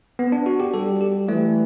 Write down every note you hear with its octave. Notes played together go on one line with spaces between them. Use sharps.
B3
D4
F#4
G4
G3 A4
G4
E3 A3